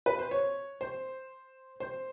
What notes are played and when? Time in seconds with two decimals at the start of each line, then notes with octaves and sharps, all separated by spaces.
0.06 B4
0.19 C5
0.31 C#5
0.81 C5
1.80 C5